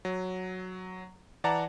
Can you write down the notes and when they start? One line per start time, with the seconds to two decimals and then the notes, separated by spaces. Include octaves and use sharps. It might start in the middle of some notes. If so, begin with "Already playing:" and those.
0.05 F#3
1.44 E3 D5 F#5 A5 A#5